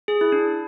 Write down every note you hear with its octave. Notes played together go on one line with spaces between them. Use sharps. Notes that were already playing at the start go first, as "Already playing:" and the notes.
G#4
E4
D4